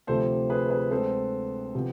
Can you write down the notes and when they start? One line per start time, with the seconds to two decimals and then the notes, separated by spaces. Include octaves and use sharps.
0.07 D2 C3 F3 A3 A4 C5
0.50 G#4 B4
0.66 A4
0.70 G#4 B4
0.91 D2 D3 G#3 C4 A4 C5
1.75 C3 F3 B3